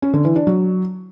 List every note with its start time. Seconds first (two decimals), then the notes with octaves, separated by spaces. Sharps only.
0.02 C#4
0.14 D3
0.25 E3
0.36 D4
0.47 F#3